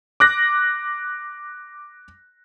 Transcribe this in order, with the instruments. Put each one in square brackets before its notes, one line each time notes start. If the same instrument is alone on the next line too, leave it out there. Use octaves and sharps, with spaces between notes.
[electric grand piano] D6 F#6 A#6